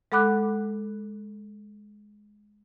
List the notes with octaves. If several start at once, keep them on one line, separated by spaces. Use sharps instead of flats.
G#3 A4 F#5 B5 D6 F#6